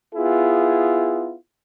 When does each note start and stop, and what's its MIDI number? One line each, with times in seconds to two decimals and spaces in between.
0.15 1.35 59
0.15 1.35 64
0.15 1.35 65
0.15 1.35 68